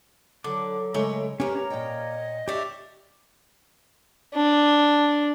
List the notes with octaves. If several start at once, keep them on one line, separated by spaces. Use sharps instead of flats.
D3 F#3 D6
C#3 G#3 A3 A#4 C#5
A#3 C#4 G4 A#4 B4
C#5 A#5
A#2 D#5 G5
D4 G4 C#5 E5
D4